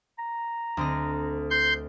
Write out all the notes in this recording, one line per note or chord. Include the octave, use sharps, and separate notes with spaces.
A#5
D2 C4 D#5
C6 G6